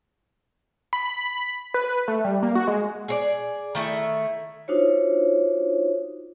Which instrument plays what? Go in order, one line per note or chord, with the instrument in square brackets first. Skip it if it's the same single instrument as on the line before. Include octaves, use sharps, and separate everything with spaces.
[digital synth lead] B5
B4
A3
G3
A#3
F#4
G#3
[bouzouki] G#4 C#5 D5
D#3 A3 E4
[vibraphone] D4 D#4 F4 F#4 C5 C#5